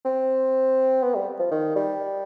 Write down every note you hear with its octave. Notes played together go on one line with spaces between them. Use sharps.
C4
B3
G3
F3
D#3
G3